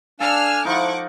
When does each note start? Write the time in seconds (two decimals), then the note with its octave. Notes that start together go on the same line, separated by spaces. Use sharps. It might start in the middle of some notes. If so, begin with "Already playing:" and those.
0.20 D4 A4 F5 G#5 E6 F6
0.65 F3 D#4 E4 F#5 C#6 D6